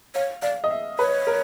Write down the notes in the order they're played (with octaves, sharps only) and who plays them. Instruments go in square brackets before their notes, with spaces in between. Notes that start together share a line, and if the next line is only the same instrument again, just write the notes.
[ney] C#5 [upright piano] F5
[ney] D5 [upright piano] F5
[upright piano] D#5
E5
[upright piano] B4 [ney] C#5
[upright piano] A#4